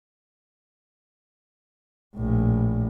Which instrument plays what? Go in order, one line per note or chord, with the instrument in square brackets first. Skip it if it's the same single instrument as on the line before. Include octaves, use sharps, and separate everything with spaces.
[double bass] A#1 A2